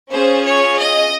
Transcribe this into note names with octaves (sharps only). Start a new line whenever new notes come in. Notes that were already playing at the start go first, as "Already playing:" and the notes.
C#4 F4 G#4 C5
C#5
D#5